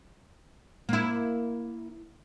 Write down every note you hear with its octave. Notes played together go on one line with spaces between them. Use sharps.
A#3 E4